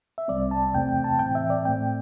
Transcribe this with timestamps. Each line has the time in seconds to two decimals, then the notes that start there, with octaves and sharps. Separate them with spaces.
0.18 E5
0.28 C2 C3 G3 C4 D5
0.51 A5
0.74 E2 C3 A3 C4 G5
0.89 G5
1.04 A5
1.19 A2 E3 C4 G5
1.35 E5
1.50 D5
1.65 A2 A3 C4 G5